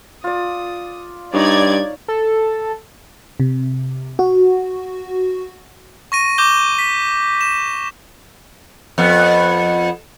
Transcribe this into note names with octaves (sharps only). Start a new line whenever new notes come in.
F4 D5 D#6
G2 D#4 C#5 D5 G#6
A4
C3
F#4
C#6 A#6 D#7
D6 G6 G7
B6
E7
F2 B3